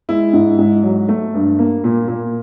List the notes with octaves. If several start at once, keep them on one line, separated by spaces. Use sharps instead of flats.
G#3 E4
G#2
G#2
F#3
A3
G2
A#3
A#2
A#2